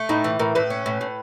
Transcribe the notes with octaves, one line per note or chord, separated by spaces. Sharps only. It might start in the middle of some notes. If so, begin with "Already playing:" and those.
Already playing: A3
A2 D#4
E3
A2 A#4
A2 B4
C#4
A2
A2